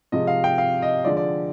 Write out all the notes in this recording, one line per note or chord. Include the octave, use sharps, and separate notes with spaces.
C3 F3 G#3 D#5
F5
G5
F5
D#5
D3 F3 G#3 D5
D5